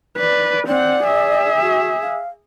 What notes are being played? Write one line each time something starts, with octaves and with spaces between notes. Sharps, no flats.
B4 D5
C4 D5 F#5
G#4 E5
F#4
F5